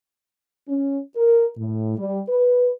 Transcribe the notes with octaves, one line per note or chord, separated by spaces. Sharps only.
C#4
A#4
A2
G3
B4